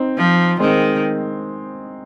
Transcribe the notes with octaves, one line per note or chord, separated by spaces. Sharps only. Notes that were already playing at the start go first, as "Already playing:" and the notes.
Already playing: C4 D#4
F3
D#3 G#3 C4